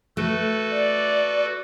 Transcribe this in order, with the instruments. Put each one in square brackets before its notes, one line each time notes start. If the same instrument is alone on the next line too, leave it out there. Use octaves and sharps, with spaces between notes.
[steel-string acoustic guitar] A3 [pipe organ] F#4 A4 B4
[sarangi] D5